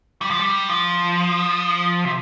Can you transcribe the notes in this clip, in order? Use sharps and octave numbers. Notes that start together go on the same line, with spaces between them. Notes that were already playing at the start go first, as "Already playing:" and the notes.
G3
F3
G3
F3
C3